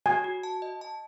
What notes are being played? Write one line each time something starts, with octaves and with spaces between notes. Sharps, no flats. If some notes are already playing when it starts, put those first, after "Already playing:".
F#4 G#5
F#4
A5
D#5
A5